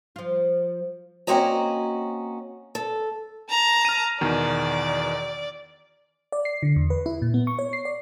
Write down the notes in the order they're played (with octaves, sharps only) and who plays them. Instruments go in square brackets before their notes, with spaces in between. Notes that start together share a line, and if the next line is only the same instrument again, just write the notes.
[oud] F3 F4
[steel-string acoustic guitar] A#3 C4 C#4 F#4 D#5 A#5
A4
[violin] A5 A#5
[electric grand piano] F6 D#7
[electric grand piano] E2 B2 D#3 [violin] D5
[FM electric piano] D5
C7
D3
E2
B4
E4
A#2
B3
C#6
C#5
C7
D5